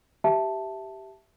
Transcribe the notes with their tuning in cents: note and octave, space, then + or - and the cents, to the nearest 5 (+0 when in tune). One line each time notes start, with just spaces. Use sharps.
G4 -10 E5 +0 A5 +0